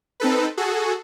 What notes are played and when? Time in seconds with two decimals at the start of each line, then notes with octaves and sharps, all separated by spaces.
0.20 C4 D#4 A4 B4
0.57 F#4 G#4 A4